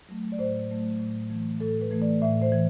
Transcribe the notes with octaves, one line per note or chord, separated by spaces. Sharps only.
F#3 A3
D5
A2 C5
F#3 A3
A2
E3 A3
A2 A4
B4
E3 A3
D5
A2 E5
C5
E3